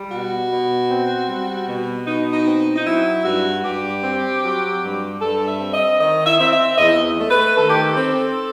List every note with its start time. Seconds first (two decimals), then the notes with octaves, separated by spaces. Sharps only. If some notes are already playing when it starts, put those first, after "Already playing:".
Already playing: G3
0.10 B2 F#4
0.50 B2
0.89 C4
1.28 G3
1.68 B2
2.06 B2 D#4
2.32 D#4
2.46 C4
2.75 D#4
2.86 F#3 E4
3.24 G2 F#4
3.64 G2 G4
4.04 C4
4.43 F#3
4.83 G2
5.21 G2 A4
5.47 E5
5.60 C4
5.74 D#5
6.00 D#3 D#5
6.26 E5
6.39 C4 E5
6.52 E5
6.78 E2 D#5
7.19 A3
7.31 B4
7.58 D#3 A4
7.70 G4
7.82 A4
7.96 C4